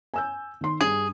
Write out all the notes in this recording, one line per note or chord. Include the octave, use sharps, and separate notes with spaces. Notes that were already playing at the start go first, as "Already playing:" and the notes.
G#5 E6 G6
D#3 C6
G2 G#4